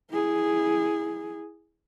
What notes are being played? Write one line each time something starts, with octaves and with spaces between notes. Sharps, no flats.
E4 G#4